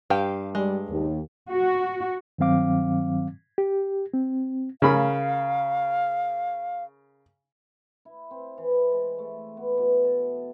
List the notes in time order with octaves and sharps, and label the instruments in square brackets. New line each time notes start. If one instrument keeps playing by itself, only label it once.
[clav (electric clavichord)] G2 [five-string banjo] G4 F5 G5
[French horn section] G3 [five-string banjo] G#3
[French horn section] D#2
[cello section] F#4
[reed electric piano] G2 D#3 F#3 C4 F5 D6
G4
C4
[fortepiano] C#3 A#4 B5 [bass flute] F5
[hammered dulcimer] E4
C4
E3
G#3
A3
B3
B2
A4